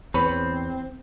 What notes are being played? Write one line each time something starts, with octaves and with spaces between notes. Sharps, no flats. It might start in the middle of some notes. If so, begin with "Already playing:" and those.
E2 C4 B4 C#5 B5